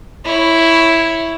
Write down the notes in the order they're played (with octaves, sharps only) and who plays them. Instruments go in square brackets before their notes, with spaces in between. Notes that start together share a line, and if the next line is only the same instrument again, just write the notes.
[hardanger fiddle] E4 C#5